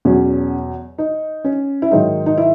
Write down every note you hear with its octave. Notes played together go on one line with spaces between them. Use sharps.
E2 B2 F#3 C#4
D#4
C#4
E4
G#2 D#3 F#3 D#4
D#4
E4